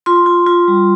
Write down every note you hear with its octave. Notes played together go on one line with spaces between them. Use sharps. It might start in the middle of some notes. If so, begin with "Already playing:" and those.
F4 C6
F4
F4
G3